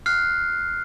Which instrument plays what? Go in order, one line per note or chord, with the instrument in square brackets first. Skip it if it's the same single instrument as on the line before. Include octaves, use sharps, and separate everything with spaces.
[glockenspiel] F6 F#6 C7